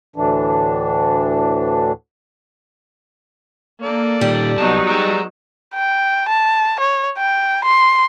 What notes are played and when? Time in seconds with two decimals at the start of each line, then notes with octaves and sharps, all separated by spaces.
0.16 D2 A2 E3 D4
3.83 A#3 A4 D5
4.21 A#2 D#3 G3
4.57 C2 F#3 B3 D#4 A5
4.88 G#3 G4 D5 A#5 E6
5.74 G5
6.29 A5
6.80 C#5
7.18 G5
7.64 C6